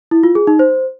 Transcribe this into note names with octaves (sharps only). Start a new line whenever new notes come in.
E4
F4
G#4
D#4
C5